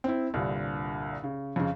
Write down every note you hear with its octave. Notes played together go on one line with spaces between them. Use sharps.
C4 E4
C2 G2 A#2 D3
C#3
F2 C#3